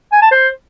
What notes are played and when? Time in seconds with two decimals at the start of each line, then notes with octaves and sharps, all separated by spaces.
0.12 G#5
0.22 A5
0.32 C5